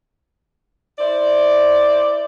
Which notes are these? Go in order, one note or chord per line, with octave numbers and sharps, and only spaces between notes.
E4 C5 D5